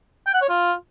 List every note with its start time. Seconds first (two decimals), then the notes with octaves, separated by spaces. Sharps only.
0.27 G5
0.34 F#5
0.42 C#5
0.49 F4